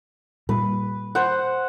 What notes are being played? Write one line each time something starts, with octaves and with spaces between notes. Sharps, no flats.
A#2 G3 B4
C5 F#5